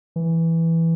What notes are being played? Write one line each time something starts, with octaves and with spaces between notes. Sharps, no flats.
E3